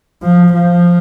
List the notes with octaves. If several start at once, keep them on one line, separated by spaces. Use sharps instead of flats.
F3
F3